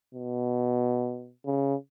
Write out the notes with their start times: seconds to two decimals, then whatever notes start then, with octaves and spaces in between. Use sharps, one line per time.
0.15 B2
1.46 C#3